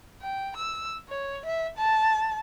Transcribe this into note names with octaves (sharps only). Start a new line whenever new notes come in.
G5
E6
C#5
E5
A5